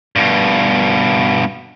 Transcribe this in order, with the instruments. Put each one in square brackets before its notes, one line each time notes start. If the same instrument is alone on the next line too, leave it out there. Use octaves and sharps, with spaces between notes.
[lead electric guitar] G2 B2